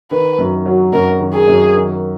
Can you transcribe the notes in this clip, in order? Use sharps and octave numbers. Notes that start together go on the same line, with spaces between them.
D#3 B4
F#2
F#3
F#2 A#4
D#3
G#4
F#2
D#3